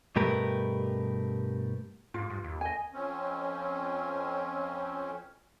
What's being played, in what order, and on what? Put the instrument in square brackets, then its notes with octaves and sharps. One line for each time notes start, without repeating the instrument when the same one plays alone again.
[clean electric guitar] G2 B2 A3 G4 A#4 B4
[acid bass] G#2 [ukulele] F4
[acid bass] G2
D#2
[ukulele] D#5 G#5
[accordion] F2 C4 C#4